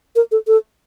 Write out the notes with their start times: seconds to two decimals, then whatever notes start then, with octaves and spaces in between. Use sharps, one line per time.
0.16 A#4
0.32 A4
0.47 A4